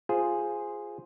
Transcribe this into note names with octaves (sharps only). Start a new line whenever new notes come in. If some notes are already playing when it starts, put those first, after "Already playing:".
F4 G#4 C5